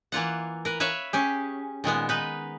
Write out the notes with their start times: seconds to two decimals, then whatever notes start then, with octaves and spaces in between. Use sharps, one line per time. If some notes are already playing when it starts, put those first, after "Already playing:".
0.12 E3 A#3 F4 F#5
0.65 A#4 B4
0.80 B4 C#5 E5 F5
1.13 C#4 G4 G#4
1.84 A#2 D#3 G#3 B3
2.09 D#4 B4